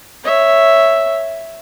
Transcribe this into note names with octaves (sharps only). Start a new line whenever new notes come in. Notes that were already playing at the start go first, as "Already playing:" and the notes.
C#5 E5